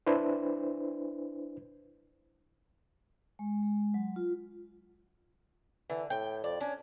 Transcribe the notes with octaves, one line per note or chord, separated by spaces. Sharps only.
D4 E4 B4 C5
G#3
G#3
F#3
F4
D3 E3
A2 G5
F2 D5
C#4 D4